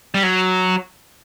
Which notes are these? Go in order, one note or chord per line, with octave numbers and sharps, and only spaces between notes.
G3
F#3